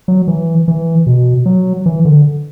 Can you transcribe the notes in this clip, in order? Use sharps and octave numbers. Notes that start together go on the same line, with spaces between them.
F#3
E3
E3
B2
F#3
E3
D3